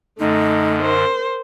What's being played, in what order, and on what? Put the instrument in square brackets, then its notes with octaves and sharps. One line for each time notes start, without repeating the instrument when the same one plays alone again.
[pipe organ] F#2 D3 [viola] A3 [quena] D#4
[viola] A#4 C5